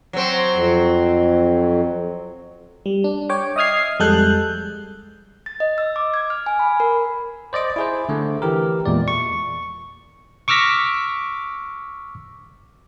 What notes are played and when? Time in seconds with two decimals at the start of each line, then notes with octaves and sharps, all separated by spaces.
0.13 F#3 C4
0.52 F2
2.86 G3
3.04 D4
3.30 C#5 G5 D6
3.56 D#5 E5 D#6 F6 G#6 C7
3.99 F2 G3 G#3 A4 F#6 G6
5.46 A6
5.60 D#5
5.78 E6
5.96 D6
6.14 G#6
6.30 F6
6.46 G#5
6.59 B5
6.80 A#4
7.53 C5 D5 D#5 D6
7.76 E4 G#4 C5
8.09 D3 A3
8.42 E3 G4 A#4
8.85 E2 A#2 G#3 D5
9.08 C#6
10.48 C#6 D6 E6 F6 A#6 B6